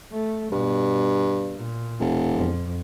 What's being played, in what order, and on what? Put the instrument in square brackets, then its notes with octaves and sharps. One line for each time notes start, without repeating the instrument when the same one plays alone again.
[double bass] A3
[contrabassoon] G2 [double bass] B2
[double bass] A#2
[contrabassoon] E1
[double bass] F2